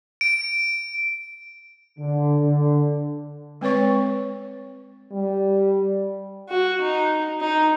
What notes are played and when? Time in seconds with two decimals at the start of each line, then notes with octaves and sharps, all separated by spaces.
0.21 D7
1.98 D3
2.42 D3
3.61 G#3 C4 B4 C#5 C#6
5.12 G3
6.49 F#4
6.81 D#4
7.40 D#4